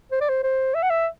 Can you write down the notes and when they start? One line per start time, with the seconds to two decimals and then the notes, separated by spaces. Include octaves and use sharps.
0.11 C5
0.21 D5
0.29 C5
0.43 C5
0.75 E5
0.83 F#5
0.90 E5